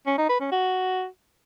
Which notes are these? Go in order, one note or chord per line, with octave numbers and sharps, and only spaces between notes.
C#4
D#4
B4
C#4
F#4